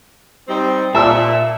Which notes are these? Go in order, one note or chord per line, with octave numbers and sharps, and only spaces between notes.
G3 C4 D#4
A#2 E5 A5 E6